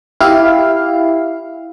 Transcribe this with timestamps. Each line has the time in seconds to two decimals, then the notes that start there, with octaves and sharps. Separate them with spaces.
0.20 E4 G4 F5